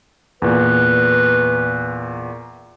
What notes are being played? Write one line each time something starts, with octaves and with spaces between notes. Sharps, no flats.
E2 A#2 B4